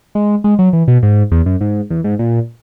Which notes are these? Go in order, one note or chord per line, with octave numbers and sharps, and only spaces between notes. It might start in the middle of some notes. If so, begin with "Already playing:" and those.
G#3
G#3
F#3
E3
B2
G#2
E2
F#2
G#2
E2
G#2
A#2